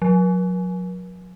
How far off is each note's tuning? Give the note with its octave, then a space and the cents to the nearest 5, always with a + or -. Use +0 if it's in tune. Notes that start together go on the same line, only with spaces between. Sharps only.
F#3 -35